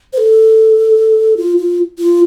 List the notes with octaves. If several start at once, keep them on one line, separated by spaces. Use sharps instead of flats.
C5
A4
F4
F4
F4